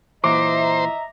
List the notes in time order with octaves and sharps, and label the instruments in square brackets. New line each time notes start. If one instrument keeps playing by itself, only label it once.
[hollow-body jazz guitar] A#2 E3 [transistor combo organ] C5 [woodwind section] D#5 E5 A#5 [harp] D6